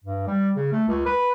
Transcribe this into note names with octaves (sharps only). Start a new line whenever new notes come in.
G2
G3
C#3
A3
C#2
B4